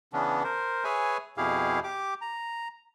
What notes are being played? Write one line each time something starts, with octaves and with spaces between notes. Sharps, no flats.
C#3 E3 B3 C#4 D4
A#4 C5
G#4 B4 C#5 E5 G#5
F2 B2 E4 G4 G#4 F5
G4 D6
A#5